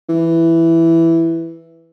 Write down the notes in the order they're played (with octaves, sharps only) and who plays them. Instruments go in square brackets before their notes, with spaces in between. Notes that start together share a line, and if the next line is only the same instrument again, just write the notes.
[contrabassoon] E3